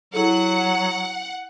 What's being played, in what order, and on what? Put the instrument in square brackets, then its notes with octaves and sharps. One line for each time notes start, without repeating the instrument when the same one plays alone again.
[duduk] F#3 [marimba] E4 G#4 A4 [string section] F#5